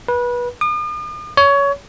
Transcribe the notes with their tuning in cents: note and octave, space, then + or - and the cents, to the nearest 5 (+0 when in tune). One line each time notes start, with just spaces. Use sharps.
B4 -25
D#6 -45
C#5 +20